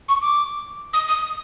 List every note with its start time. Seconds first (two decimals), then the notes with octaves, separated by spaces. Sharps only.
0.09 C#6
0.22 D6
0.93 D#6
1.08 D#6